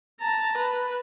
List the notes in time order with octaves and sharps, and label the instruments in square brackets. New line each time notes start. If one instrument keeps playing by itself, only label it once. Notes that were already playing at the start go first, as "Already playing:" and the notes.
[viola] A5 A#5
B4